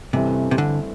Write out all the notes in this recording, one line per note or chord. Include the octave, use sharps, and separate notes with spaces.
A1 G2 C3 E3 A3 C4
C3
D3